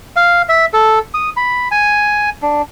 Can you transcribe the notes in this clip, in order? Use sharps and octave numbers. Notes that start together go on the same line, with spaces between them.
F5
E5
A4
D#6
B5
G#5
D4